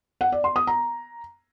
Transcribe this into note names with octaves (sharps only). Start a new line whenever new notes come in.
F#5
D5
C6
D#6
A#5